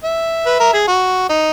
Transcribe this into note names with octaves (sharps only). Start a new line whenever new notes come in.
E5
B4
A#4
G#4
F#4
D#4